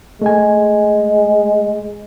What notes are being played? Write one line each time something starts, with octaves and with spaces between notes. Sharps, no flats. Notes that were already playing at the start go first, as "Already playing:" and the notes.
G#3 A3 G#5